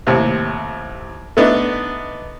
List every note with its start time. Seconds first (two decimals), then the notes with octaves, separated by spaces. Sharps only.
0.07 D#2 A2 C3
1.37 A3 B3 D4 D#4